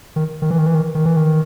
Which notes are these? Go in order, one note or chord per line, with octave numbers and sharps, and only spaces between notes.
D#3
D#3
E3
D#3
E3
D#3
D#3
E3
D#3